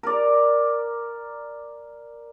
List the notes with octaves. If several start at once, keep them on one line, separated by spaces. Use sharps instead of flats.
A#4 D5